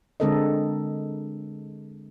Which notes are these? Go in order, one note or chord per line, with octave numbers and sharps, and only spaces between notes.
D3 G#3 C4 A4 A#4 D#5